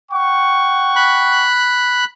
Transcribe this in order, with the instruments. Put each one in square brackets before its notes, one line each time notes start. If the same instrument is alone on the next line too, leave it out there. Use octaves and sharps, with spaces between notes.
[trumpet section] F#5 G5 C#6
[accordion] B5 F#6